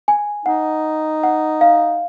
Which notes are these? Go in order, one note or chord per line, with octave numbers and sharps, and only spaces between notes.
G#5
D#4 F#5
F#5
F5